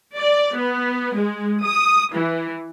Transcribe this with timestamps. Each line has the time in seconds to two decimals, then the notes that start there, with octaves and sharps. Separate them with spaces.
0.17 D5
0.56 B3
1.16 G#3
1.64 D#6
2.13 E3